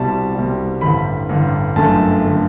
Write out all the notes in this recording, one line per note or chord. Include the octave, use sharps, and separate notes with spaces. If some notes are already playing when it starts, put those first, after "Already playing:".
Already playing: C2 B2 G3 A5
C2 B2 G3
A1 G2 D3 B5
A1 G2 D3
G1 F#2 D3 A3 A5
D3 A3